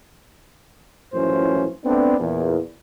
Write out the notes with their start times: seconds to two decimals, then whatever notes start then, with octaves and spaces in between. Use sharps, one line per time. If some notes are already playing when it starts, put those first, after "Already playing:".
1.13 F#2 A2 E3 F3 C#4 C5
1.84 A3 B3 C4 D4
2.19 E2 A#2